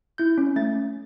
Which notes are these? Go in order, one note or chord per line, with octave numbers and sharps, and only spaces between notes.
E4 G6
C#4
A3 A6
C#4